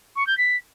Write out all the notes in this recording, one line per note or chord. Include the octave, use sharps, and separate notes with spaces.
C#6
G6
B6